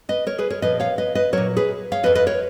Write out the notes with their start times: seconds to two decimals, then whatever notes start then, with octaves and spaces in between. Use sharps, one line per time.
0.09 B4 D#5
0.27 A#4 C#5
0.38 G#4 B4
0.50 A#4 C#5
0.62 A#2 F3 B4 D#5
0.80 C#5 F5
0.98 B4 D#5
1.15 B4 D#5
1.33 A#2 F#3 A#4 C#5
1.56 G#4 B4
1.92 C#5 F5
2.03 F2 F3 B4 D#5
2.15 B4 D#5
2.27 A#4 C#5